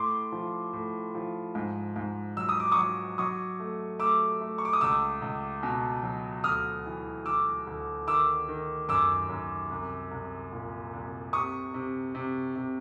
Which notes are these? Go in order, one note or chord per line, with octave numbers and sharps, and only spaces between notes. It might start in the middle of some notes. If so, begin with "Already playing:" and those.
Already playing: A2 C6 D6
F3
A2
F3
G#2
G#2
F#3 E6
D#6
D6
C#6 D#6
F#3
F#3 C#6 D#6
A3
A3 D6 E6
A3
C#6
D6
D#6
C#2 D6 E6
C#2
B2
F#3
D2 D#6 F6
E3
E3 D6 E6
D2
D#3 D6 E6
D#3
F#2 D6 E6
F#2
C2
C2
A#2
C2
C3 C#6 D#6
C3
C3
C3